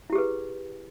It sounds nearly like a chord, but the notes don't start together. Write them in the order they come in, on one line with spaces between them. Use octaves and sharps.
E4 G4 G#4 B4